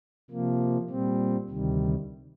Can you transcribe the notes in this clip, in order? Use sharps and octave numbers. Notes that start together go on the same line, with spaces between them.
C3 F3 A#3
A#2 G3 C4
D2 C3 D#3 G3